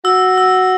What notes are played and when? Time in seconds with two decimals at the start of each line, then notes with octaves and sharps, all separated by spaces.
0.05 F#4 E6
0.38 E6